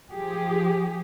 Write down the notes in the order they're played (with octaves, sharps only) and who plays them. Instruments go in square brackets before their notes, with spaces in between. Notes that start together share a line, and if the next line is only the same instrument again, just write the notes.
[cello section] F3 G4 G#4